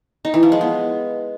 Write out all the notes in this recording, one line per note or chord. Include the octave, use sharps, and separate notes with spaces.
D#4
E3
F3
G#3
B3